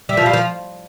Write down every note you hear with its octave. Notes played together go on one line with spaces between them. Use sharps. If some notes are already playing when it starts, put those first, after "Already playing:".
G3 E5
F3
G3 F5
F3